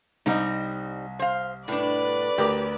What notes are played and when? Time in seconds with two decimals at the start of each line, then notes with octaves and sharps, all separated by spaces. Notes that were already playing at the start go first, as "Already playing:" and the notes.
0.26 C2 G3 C4 D#4 D#5
1.19 C5 F5
1.68 A2 D4 B4 D5
2.38 D2 G4 A#4 D6